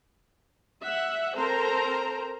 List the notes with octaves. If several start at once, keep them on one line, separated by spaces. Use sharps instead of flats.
E5 F#5
C4 A4 A#4 C5 A#5